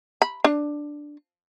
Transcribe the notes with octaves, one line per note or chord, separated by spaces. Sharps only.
B5
D4